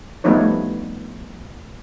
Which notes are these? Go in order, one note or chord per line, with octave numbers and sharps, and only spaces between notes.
F3 G3 A3 B3 D#4 C#5